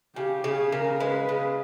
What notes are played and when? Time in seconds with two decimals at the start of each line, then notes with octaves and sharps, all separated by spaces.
0.16 C#3 G4
0.44 C#3 G#4
0.72 C#3 A#4
1.00 G#3 B4
1.29 C#3